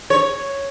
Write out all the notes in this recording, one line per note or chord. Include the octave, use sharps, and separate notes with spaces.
C#5